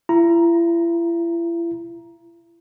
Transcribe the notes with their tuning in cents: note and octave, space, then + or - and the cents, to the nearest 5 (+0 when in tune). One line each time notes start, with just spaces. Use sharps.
E4 +40 A#5 +10